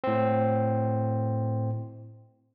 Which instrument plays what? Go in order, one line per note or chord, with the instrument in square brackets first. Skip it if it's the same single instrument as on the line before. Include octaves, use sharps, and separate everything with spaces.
[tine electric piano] A2 C4